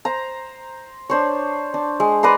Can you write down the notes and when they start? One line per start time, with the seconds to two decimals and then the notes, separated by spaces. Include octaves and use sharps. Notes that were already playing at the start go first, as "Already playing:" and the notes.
0.05 C5 A#5
1.10 D4 C5 C#5
1.74 D4
2.00 G#3
2.23 B4 D5 A#5 C6